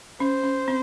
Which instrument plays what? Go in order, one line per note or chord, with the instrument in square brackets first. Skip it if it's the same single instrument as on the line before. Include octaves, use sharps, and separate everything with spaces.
[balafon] C#4 [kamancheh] C5
[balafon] C#4
C4